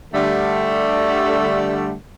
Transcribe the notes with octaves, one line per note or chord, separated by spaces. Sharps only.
D3 G3 A3